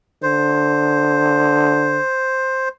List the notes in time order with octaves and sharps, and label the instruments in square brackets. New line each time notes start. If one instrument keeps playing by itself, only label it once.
[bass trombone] D3 [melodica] C5